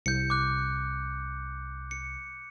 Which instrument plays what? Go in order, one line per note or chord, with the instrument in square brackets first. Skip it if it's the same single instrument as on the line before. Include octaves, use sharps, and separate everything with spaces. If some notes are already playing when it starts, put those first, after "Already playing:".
[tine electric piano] C2 [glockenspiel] G6 C#7
[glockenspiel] D6 F#6
C#7